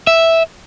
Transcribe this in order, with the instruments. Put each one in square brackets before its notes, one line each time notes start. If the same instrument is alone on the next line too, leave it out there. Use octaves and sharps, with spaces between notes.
[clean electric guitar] E5